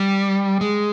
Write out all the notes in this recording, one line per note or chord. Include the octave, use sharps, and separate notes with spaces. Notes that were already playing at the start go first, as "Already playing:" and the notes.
Already playing: G3
G#3